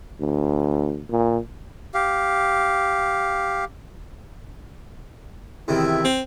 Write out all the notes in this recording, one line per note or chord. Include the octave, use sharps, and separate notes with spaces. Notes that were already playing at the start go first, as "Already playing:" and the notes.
D2
A#2
G4 F5
E2 C3 D#3 E4
C4